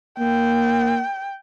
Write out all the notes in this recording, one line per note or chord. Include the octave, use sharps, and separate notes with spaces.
A#3 G5